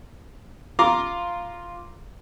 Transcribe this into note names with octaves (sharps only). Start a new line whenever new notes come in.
F4 A#5 C6 D6